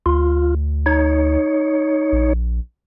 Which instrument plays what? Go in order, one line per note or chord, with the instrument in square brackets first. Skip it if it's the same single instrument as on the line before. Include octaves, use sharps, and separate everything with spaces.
[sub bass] D2 [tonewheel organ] F4
[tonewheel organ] D#4 C#5
[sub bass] A#1